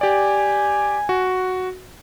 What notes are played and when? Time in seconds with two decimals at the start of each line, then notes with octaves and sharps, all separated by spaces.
0.01 G4 D5 G#5
1.09 F#4